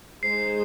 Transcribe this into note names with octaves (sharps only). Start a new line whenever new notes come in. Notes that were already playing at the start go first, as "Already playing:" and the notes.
G#3 D#4 G#4 C5 C7